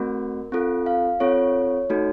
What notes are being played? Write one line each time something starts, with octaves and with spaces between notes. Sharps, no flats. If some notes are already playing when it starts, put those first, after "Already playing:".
Already playing: A3 C4 F#4 A#4
C4 F4 A4
F5
C4 F4 A4 C#5
A3 D#4 F#4 A4